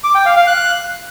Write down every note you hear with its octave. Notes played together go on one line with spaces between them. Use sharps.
D6
G5
F5
F5
F#6